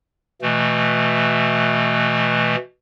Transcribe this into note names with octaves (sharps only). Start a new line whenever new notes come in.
B2 E3 A3